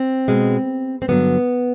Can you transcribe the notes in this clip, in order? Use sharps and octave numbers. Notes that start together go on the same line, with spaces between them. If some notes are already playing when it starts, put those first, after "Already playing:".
Already playing: C4
B2 G#3
C4
G2 D3 F#3 B3